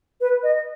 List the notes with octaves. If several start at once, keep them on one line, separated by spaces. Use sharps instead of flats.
B4
D#5